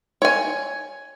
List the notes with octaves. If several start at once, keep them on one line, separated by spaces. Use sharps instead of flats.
C#5 G#5